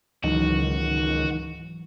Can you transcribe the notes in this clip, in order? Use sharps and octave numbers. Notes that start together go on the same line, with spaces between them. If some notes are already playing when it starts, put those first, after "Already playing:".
C#2 G#2 D#3 E3 F#3 F#4